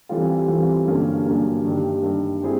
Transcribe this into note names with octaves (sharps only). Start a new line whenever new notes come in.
E3 G3 C4 F4 A4
E3 G3 C4 F4 A4
G2 D3 F#3 A#3 C#4
G2 D3 F#3 A#3 C#4
G2 D#3 G3
G2 D#3 G3
G3 C4 E4 G#4